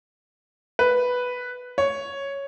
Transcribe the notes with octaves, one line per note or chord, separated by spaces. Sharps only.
B4
C#5